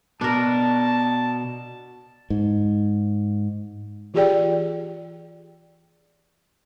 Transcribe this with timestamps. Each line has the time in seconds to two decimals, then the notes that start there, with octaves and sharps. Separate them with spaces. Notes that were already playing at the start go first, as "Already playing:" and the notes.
0.21 B2 D4 A#4 A5
2.30 G#2
4.14 E3 F4 G4 G#4 D5 G5